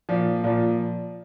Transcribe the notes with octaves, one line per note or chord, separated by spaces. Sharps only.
A#2 F3
A#2 F3